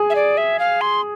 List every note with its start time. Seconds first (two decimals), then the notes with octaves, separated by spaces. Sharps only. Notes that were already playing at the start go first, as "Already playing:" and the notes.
Already playing: G#4
0.10 E5
0.15 D5
0.37 E5
0.59 F5
0.81 C6